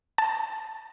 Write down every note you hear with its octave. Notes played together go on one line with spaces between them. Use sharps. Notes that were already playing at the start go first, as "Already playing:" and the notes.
A5